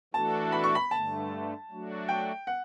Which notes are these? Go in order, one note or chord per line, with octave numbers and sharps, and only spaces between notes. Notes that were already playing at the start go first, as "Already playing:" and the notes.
E3 A3 D4 F#4 A4 A5
B5
C#6
B5
G2 D3 A3 A5
F#3 A3 D4 F#4
G5
F#5